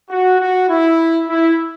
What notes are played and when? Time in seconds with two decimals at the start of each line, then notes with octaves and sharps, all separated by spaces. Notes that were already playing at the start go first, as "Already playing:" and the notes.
0.11 F#4
0.39 F#4
0.69 E4
1.28 E4